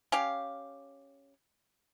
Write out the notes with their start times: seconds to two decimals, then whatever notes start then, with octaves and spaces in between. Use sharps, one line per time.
0.12 C#4 G4 F5